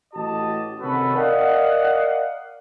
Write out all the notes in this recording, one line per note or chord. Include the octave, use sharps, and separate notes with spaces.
A1 F#4 G4 D#5 A5
C3 D#3 C#4 F#4 A4 B4
A#4 D5 D#5 F5 F#5